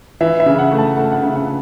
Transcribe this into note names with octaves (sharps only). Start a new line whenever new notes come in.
E3 E5
E5
C#3
F#5
A3
A5
A3 F#5
F#5
E5
C#3
F#5